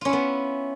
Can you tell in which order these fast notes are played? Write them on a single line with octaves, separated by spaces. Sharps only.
F4 C#4 E4 B3